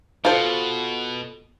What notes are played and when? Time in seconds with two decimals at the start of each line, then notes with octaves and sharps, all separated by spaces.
0.25 B2 F4 A4 C5